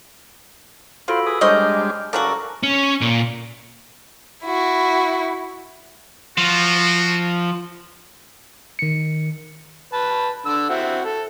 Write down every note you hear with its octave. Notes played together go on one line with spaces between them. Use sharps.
F4 F#4 A4 C5 B5
G#4 B4 D#6
G3 G#3 D4 C5 C#5 D#5 F6 G6
C#3 F#3 F#4 A4 A#4 D5
C#4
A#2
E4 F#4
F3 F#4
D#3 C#7
B4 A5
D3 E6
C4 E4 F#4
A4